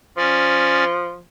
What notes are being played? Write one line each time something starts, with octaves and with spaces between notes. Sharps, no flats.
F3 C#4 D5